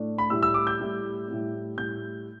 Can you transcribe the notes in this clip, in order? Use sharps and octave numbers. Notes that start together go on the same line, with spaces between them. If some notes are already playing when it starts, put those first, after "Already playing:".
Already playing: A2 A3 D4
B5
A2 G3 E4 E6
E6
D6
G6
A2 G3 E4
A2 G3 E4
A2 G3 E4 G6